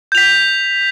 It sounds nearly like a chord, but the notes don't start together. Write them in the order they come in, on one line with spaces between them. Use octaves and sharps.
G6 F7 B6